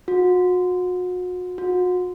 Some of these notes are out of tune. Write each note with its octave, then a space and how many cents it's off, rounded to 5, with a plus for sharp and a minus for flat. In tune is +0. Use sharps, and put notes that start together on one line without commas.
F#4 -35
F#4 -35